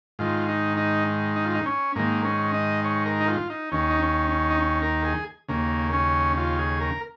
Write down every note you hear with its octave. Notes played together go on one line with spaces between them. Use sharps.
G#2 D#3 F4
D#4
D#4
D#4
F4
D#4
C#4
G#2 D#3 A#3
C#4
D#5
C#5
A#4
D#4
F4
D#4
D#2 D#3 C#4
D#4
C#4
C#4
D#4
C#4
A#4
G#4
D#2 C#3 A#3
C#4
F4
G#4
A#4